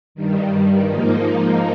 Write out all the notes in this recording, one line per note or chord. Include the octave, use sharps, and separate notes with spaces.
G2 D#3 G3
G#2 F3 A#3 D#4